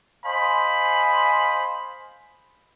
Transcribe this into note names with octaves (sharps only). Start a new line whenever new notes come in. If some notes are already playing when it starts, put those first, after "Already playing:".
C5 D#5 F5 G#5 B5 C6